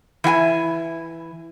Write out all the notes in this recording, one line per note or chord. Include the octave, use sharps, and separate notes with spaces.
E3 E4 G5 G#5